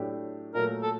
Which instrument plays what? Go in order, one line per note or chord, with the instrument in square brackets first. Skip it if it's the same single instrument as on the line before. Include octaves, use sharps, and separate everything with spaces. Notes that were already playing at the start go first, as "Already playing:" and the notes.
Already playing: [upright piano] A2 F#3 A3 D4 G4
[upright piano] A#2 F#3 A3 [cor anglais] A#4
[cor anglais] A4